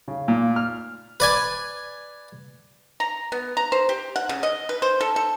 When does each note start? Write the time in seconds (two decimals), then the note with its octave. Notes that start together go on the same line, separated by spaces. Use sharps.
0.08 C#3
0.28 A#2
0.56 F6
1.20 B4 D5 G#5
3.00 A#5
3.32 B3
3.57 A#5
3.72 C5
3.89 G4
4.16 F#5
4.29 C#3
4.43 D#5
4.69 B4
4.82 C5
5.01 A4
5.16 A4